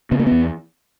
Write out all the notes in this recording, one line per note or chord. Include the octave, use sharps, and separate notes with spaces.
C#3 B3
A#3
E2 B3